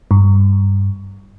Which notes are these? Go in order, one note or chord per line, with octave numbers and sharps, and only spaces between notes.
G2